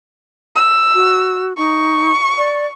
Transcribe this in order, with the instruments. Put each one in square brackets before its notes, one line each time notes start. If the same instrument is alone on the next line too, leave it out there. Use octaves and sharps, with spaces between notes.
[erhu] E6
[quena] F#4
[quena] D#4 [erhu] C#6
[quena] D5